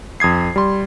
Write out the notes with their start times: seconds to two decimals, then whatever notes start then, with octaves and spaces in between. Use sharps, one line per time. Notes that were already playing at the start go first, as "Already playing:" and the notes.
0.20 F2 D#6 G#6 C7
0.56 G3 C6